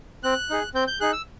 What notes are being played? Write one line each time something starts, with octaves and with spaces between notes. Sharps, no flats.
C4 F#6
D#4 G#4
C4 G6
G6
D#4 G#4 F#6
E6